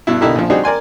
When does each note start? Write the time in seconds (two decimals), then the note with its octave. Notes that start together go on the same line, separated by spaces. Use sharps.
0.07 G2 B2 E4
0.21 B1 D3 D#4 E4 G4 A#4
0.35 A#1 F3
0.50 G3 C4 D4 D#4 F#4 G#4
0.64 A#4 D5 G#5 C6